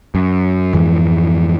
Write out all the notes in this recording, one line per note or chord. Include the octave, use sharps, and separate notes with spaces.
F#2
F2 G#2 E3 G#3